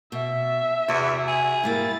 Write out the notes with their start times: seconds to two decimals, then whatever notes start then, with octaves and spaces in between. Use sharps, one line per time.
0.12 B2 E5
0.88 E2 C3 F#4
1.28 G#4
1.63 G#2 G3 A#3 E4 A6